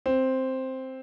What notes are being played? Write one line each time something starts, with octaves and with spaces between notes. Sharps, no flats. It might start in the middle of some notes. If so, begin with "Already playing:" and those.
C4